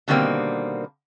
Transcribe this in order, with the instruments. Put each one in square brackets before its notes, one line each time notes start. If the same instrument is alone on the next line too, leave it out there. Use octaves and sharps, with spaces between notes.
[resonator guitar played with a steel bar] B2 D3 D#3 G3 A#3 C4